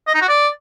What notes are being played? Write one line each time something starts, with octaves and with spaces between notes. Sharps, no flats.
D#5
D#4
F#4
D5